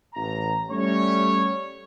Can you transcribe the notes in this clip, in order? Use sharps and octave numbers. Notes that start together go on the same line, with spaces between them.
A1 A#5
G3 A3 C#4 C#5